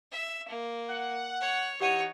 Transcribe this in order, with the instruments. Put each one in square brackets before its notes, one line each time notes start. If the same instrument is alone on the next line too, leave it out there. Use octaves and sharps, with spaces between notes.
[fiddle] E5
A#3
[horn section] F#5
[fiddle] C#5
[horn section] E3 D#4 [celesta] G4 F#5 D#7 [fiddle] C#5